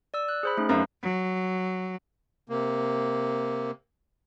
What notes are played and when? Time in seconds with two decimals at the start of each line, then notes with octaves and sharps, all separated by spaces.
0.14 D5 E6
0.29 F#6
0.43 G#4 C5 B5
0.57 A3 C#4 D#4
0.69 F#2 A#4 B4 F5
1.02 F#3
2.49 C3 A#3